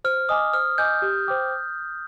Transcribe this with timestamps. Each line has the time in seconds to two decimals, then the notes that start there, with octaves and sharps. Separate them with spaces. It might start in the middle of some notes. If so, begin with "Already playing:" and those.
0.04 C5 F6
0.29 D#5 G#5 D6 D#6
0.53 C5 F6
0.78 D#5 G#5 D6 G6
1.02 G4
1.27 C5 G5 D6